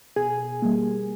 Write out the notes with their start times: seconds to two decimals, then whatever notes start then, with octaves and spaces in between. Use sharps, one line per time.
0.16 B2 G#4 G#5
0.62 G3 A#3